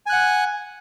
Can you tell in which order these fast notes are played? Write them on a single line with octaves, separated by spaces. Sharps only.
G#5 F#6 F#5